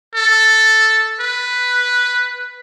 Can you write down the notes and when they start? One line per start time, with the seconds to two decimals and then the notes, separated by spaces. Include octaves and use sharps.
0.15 A4
1.20 B4